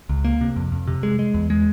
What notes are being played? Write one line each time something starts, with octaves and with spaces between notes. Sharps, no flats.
C#2
A#3
C3
F2
F2
C3
G#3
G#3
E2
G#3